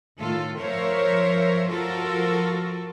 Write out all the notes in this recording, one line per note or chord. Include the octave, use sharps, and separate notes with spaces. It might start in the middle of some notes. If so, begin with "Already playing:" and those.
A2 D#3 F4 A4
F3 A#4 C5 C#5 E5 F5
F3 F4 F#4 A4 A#4